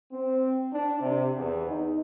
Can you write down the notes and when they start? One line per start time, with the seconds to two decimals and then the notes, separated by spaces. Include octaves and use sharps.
0.12 C4
0.73 D4
1.01 C3
1.37 E2
1.70 D#4